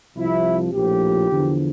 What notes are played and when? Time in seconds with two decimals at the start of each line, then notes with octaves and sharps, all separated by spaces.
0.17 C2 C3 F3 E4
0.73 A#1 A2 F3 G4
1.30 E2 D3 F3